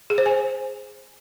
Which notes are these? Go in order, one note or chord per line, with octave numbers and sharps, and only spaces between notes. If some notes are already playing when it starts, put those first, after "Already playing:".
G#4
C5
G#5